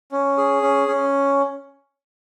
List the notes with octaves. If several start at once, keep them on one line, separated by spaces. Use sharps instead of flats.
C#4
G#4
C#4
C#4